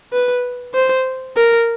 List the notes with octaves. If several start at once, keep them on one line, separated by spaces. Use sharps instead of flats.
B4
C5
A#4